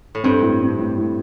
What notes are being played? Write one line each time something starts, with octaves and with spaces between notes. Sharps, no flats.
A2
G2 C4
A2
C4
A2
A2